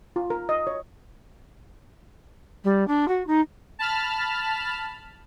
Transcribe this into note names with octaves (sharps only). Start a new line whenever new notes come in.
F4
A#4
D#5
C#5
G3
D4
F#4
D#4
A5 B5 F6